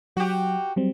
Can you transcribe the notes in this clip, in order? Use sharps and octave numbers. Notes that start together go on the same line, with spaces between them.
F#3 F#4 G4
F#3 G3 C4